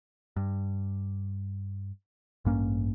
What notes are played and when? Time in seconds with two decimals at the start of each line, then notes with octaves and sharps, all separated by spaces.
0.36 G2
2.45 A1 G2 A#3 C#4